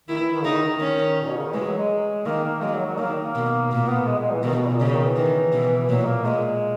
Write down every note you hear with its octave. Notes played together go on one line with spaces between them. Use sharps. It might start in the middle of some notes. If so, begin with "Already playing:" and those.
D#3 E4
E3
D#3
C#3 D#4
D#3
D#3
C#4
A#2
B2
C#3
D#3
E3 G#3
F#3
G#3
D#3 A#3
A#3
F#3 G#3
F#3
F#3
D#3 A#3
A#3
B2
A#2 A#3
B3
G#3
G#3
E3
B2 D#3
B2
A#2
C#3
D#3
E3
D#3
B2
A#2 F#3
A#3
A#2 G#3